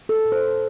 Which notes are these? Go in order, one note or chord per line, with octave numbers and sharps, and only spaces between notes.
A4
A#2
C5